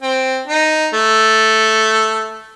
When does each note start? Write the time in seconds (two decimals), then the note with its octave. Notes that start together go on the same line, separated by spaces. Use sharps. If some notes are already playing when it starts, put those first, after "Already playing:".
0.02 C4
0.48 D#4
0.93 A3